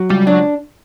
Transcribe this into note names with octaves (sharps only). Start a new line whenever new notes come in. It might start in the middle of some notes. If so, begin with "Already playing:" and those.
Already playing: F#3
C#2 G3
F#3 D4